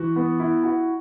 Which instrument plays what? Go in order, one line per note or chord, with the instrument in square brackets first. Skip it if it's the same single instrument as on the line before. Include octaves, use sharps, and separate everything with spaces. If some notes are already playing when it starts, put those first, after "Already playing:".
Already playing: [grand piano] E3 [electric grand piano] F#4
[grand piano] B3
E4
F#4